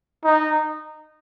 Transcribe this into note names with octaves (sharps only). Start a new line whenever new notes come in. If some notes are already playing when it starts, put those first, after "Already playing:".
D#4